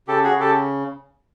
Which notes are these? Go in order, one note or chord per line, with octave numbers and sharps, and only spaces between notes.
C#3 G4 A4
F#4 G#4
C#3
G4 A4